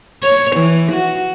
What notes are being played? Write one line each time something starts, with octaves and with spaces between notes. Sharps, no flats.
C#5
E3
F#4